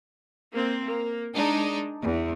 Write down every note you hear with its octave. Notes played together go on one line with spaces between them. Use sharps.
A#3 C4
A#3
G#3 D4 D#4
E2